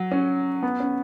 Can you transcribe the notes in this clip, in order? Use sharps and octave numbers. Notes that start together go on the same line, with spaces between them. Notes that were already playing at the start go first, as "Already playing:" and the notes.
Already playing: F#3
C#4
B3
C#4